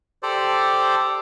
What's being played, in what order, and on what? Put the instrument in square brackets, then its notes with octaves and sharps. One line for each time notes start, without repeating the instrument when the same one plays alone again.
[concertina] G4 A4 C5 D5